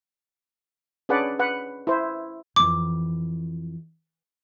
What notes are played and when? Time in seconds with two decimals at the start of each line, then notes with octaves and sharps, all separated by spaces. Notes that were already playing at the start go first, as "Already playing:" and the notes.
1.09 C#4 D4 G#4 B4 D5 F#5
1.39 B4 F#5
1.87 E4 C5
2.56 F2 E3 D6